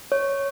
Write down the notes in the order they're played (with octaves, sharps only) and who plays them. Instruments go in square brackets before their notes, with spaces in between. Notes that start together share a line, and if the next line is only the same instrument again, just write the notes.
[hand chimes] C#5